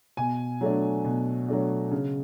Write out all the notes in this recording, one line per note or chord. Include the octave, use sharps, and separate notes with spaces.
B2 G#5
F#3 A3 D4
B2
F#3 A3 D4
C#3